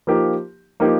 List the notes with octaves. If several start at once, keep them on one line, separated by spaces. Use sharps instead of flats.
F3 A#3 D#4 G4 A#4
F3 A#3 D#4 G4 A#4